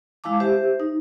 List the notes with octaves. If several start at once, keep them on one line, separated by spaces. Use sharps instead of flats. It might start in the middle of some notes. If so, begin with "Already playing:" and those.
G#3 E4 F5 A5 D6
G4 C5 E5
D#4